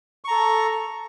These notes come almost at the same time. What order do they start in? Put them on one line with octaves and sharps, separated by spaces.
C#6 A#5 A4